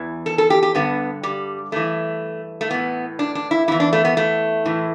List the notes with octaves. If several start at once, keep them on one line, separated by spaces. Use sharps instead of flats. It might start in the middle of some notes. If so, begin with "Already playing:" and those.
Already playing: E2 E3
A4
A4
G4
G4
G2 D3 B3
G3
G2 E3 A3
A3
A2 E3 B3
D4
D4
E4
E2 E3 E4
D4
A3
B3
A3
A2 E3